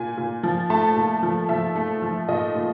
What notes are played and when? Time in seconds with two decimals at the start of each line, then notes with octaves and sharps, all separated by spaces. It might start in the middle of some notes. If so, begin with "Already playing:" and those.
Already playing: A#2 G#5
0.17 A#2
0.43 F3
0.70 A3 A5
0.97 A#2
1.23 F3
1.49 F3 E5
1.75 A3
2.02 F3
2.28 A#2 D#5
2.55 A#2